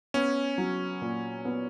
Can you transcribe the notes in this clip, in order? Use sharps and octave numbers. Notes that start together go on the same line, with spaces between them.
B3 C#4
F#3
A#2
B3